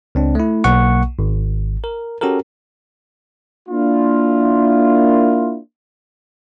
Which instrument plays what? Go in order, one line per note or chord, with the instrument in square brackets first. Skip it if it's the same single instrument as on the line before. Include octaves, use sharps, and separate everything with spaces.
[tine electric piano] C#2 C4 D4
A3 E4
B1 A#3 F#5 C#6
G#1
A#4
C#4 F#4 G4 A4 A#4
[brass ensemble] A#3 D4 E4 F4